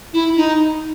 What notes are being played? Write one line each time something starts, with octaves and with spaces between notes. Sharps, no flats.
E4
D#4